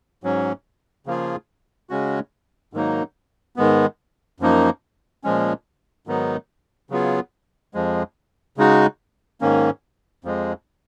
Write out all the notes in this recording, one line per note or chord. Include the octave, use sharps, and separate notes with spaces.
G#2 F#3 C#4
C#3 F3 A#3 F4 G#4
C#3 G#3 C#4 F#4
G#2 D#3 F#3 A#3 D#4
G#2 D#3 G#3 B3
F#2 F3 A#3 D#4
A#2 F3 G#3 C#4
G#2 D#3 F#3 B3 D#4
C#3 F#3 B3 F4 G#4
F2 F3 G#3
C#3 G#3 D#4 F#4
G#2 D#3 A#3 C#4
F2 F3 G#3